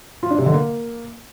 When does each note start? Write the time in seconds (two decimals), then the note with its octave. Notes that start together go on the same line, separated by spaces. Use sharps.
0.23 F4
0.31 D4
0.38 C3
0.46 D3
0.54 A#3